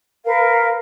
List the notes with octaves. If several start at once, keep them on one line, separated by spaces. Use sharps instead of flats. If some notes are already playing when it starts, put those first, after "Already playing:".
A#4 B4 F5